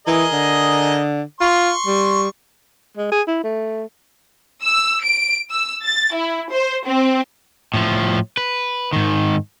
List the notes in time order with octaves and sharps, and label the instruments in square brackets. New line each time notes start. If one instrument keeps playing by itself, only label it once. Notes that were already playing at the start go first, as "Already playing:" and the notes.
[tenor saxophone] E3 [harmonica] G#4 A#4 D#5
[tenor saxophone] D3
[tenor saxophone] F4 [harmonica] C6 C#6
[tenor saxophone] G3
[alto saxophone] G#3
G#4
E4
A3
[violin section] E6
D7
E6
A6
E4
C5
C4
[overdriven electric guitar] A2 F3
B4
G#2 D#3